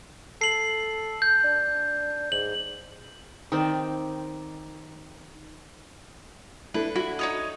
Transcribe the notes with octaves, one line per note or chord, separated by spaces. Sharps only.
A4 C7 F#7
G6
D4
G#2 F#7
D#3 C4 D5
D4 E4 A4 B4
E4 F#4
D#4 C#5 D#5